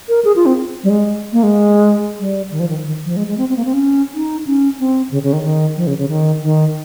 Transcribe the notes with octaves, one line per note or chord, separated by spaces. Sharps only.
A#4
G#4
F4
C4
G3
G#3
A#3
G#3
G3
D#3
F3
D#3
D#3
F3
G#3
G#3
C4
C4
A#3
C4
C#4
D#4
C#4
C4
C#3
C#3
D#3
D#3
F3
C#3
C#3
D#3
D#3